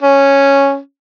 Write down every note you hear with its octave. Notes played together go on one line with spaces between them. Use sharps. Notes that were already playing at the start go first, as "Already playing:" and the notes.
C#4